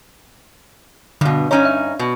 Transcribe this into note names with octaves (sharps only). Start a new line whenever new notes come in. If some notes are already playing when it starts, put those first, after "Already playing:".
G2 B2 D3
G2 C#4 D#4 C#5 A#5
E5
B2